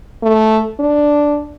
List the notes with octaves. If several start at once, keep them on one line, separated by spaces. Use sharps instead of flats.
A3
D4